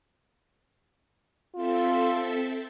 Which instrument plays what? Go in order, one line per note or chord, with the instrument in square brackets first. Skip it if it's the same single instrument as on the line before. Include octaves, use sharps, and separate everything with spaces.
[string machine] C4 A4 E5 [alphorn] F4